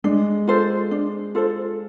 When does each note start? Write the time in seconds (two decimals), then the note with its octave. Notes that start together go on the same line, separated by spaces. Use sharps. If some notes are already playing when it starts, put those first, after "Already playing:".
0.04 G#3 D4
0.47 F4 A4 C5
0.91 D4
1.35 F4 A4 C5